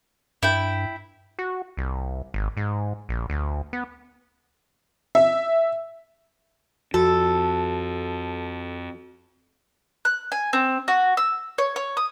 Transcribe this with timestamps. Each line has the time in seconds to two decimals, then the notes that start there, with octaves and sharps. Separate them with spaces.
0.43 G2 E4 G5
1.39 F#4
1.77 C2
2.34 G#1
2.57 G#2
3.09 A#1
3.30 D2
3.73 B3
5.15 E5
6.94 F2 F#4 A4
10.05 F#6
10.32 G#5
10.53 C4
10.88 F#4
11.17 E6
11.58 C#5
11.76 C#5
11.97 D#6